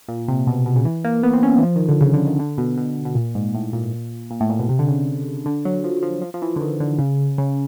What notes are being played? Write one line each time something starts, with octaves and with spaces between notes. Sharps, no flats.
A#2
C3
B2
B2
C#3
E3
A#3
B3
C4
C#4
E3
F3
D#3
D3
C#3
D3
D#3
D3
B2
B2
B2
A#2
G#2
A2
A#2
A#2
A2
A#2
B2
C3
D3
C#3
D3
F#3
F3
F3
F3
F3
E3
D3
D#3
D3
C#3
C#3